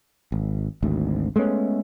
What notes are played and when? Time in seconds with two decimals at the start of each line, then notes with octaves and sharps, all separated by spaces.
0.32 G#1
0.83 G#1 D2
1.36 G#3 A3 B3 C#4